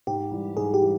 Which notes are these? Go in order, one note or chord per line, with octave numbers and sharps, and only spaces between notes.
G#2 G4
E3 G3
G#2 G#4
G4
E3 G3